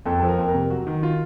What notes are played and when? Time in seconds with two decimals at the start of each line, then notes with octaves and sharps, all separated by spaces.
0.06 F2 A4
0.20 F3 A4
0.28 A#4
0.38 F2
0.49 A#4
0.54 C3
0.70 F#3 F#4
0.87 D#3
1.03 F4